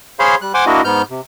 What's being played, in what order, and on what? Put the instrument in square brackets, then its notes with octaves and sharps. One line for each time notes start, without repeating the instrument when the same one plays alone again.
[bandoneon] G#4 C5 C#5 F5 B5 C6
G3 F#6
C5 F#5 G#5 C6 D6
A#3 D4 E4 F#4 D#5
G#2 B3 F6 G6
C3